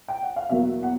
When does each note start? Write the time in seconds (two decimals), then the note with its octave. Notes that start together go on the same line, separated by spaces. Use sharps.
0.08 G5
0.23 F#5
0.36 F5
0.49 E2 B2 F#3 A#3 E5
0.83 F#5